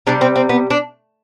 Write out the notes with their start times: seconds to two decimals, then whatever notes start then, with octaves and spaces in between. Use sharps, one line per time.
0.07 C3 G3 D4
0.21 C4
0.36 C4
0.49 B3
0.70 D4